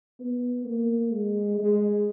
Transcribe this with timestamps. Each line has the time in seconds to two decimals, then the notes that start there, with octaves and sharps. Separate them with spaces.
0.20 B3
0.65 A#3
1.12 G#3
1.58 G#3